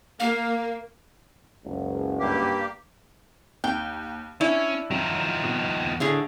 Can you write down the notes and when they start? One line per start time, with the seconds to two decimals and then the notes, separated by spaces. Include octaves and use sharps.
0.20 A#3 F5
1.64 F#1 C#2
2.19 G2 A#3 G4
3.64 D#2 G5
4.41 C#4 D4 E4
4.91 D#3 F3 F#3
5.43 B2
6.00 A2 D3 G#4